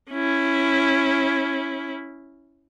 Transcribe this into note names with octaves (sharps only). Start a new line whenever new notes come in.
C#4 E4